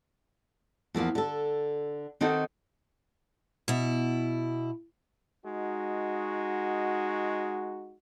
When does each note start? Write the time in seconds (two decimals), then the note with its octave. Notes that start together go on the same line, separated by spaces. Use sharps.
0.94 E2 F3 A#3 F4
1.15 D3 A4
2.21 D#3 C4 D#4 F#4 A4
3.68 B2 E4
5.45 G#3 D#4 F#4